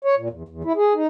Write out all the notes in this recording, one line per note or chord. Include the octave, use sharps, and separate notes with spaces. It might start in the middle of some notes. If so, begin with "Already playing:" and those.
C#5
A#2
E2
E2
E4
G#4
D#4